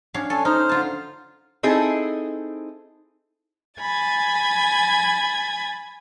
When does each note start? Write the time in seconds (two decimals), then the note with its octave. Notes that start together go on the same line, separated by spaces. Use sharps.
0.14 C#4 D4 F5
0.30 D4 A4 C#5 G#5
0.45 D#4 C5 F6
0.69 D3 F4 A5
1.63 C4 D#4 E4 G#4 A4
3.81 G#5 B5 G#6 A6